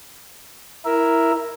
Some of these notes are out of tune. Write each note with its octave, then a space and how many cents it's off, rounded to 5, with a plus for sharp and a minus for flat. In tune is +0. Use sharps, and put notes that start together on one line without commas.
E4 +0 A#4 +0 E5 +0